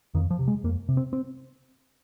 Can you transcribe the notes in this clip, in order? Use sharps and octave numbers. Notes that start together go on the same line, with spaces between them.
F2 D#3
F3
C3
G#3
F2 A#3
C3
C4
C4